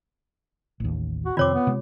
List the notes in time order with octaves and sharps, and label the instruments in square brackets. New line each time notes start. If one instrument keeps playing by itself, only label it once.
[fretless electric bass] A1 D#2
[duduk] F#4
[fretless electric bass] F2 C3 D#3 [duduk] C4 [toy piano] F4 C#5 D6
[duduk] B3
[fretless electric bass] C3 G#3